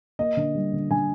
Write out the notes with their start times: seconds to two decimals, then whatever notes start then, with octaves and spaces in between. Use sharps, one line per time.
0.19 A#3 D#5
0.37 D3
0.55 G3
0.73 D3
0.90 D3 G#5